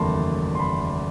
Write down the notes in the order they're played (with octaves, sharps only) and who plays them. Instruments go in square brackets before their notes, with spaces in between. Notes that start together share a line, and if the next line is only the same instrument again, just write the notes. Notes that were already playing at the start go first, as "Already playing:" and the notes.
Already playing: [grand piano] F#1 E2 D#3 A3 A5 B5 C6
C6
B5